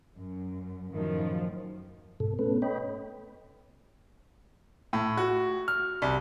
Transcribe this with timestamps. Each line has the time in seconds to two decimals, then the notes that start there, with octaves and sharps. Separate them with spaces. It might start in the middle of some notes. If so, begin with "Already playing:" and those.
0.16 F#2
0.91 F#2 A2 D#3 F3 F#3
2.20 G#2 B2 A4
2.39 A3 B3 C#4 A4 B4
2.62 C#5 D#5 G5 B5
4.93 A2
5.17 F#4
5.68 F6
6.02 C2